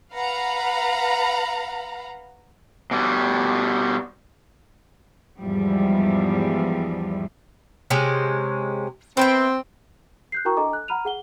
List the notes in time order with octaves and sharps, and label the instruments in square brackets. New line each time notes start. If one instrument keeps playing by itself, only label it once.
[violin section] B4 F5 F#5 A#5 B5
[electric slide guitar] B2 G3
[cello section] E2 G#2 F3 G3
[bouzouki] C3 G#3 C#4
[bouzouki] B3 E5 G5 [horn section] C4
[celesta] F#6 G6 C7
E4 F#4 A#4 G5 A#5 C#6
D4 A4 D#5 G#5 A#5 D6
F#6
F#5 A#5 B5 F6 D#7 F7
G#4 F#5 G7